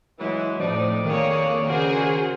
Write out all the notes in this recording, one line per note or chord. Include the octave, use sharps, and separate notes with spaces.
E3 F#3 G#3 E4
F2 A2 F3 D4 D#4 D5
D#3 A#3 G#4 C#5
C#3 F#4 G#4 A#4 C5